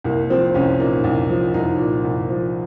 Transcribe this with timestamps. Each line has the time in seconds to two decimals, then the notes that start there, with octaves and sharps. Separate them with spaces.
0.04 C2 A#3
0.29 F3 C4
0.54 C2 C#4
0.79 A#2 D#4
1.04 C2
1.29 F3
1.54 C2 D#4
1.78 A#2
2.04 C2
2.29 F3